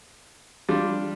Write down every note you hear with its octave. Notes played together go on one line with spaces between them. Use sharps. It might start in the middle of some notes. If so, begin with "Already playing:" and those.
G3 D4 F4